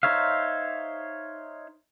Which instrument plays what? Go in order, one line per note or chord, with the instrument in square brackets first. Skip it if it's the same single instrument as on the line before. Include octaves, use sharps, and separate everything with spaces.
[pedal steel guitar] D#4 C5 C#5 E5 F5